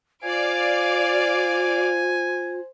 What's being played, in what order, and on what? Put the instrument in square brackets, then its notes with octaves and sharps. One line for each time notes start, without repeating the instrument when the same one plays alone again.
[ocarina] F4 [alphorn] C5 [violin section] D5 F5 D7 [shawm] G#5